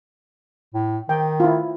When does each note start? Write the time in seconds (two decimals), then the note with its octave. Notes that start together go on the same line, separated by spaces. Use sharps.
0.74 A2
1.09 D#3 G5
1.40 E4 F4